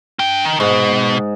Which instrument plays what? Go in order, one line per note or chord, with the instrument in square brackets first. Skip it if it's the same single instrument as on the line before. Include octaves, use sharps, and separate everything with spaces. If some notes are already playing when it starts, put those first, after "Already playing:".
[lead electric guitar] D4 G5
D#3
[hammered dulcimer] G#2 [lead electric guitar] B2